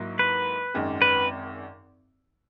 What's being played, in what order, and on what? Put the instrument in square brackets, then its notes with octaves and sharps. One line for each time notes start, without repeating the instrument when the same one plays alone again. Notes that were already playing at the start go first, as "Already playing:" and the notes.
Already playing: [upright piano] G#2 F#3 A#3 E4
[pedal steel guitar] B4
[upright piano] G#1 F#2 D#3 G#3
[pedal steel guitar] B4